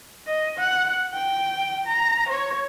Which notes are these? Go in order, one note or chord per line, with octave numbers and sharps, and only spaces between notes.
D#5
F#5
G5
A#5
C#5